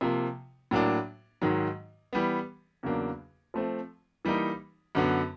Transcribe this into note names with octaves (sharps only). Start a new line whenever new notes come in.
C3 F3 A#3
A2 F#3 A#3 D4
G#2 D#3 F#3
E3 G3 B3
E2 C#3 F#3 A#3 D4
F3 A3 C4
E3 G3 A#3 D#4
F#2 D3 F#3 B3